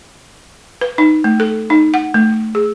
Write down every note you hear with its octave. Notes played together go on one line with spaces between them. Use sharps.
B4
D#4
A3
A4
D#4
F#5
A3
G#4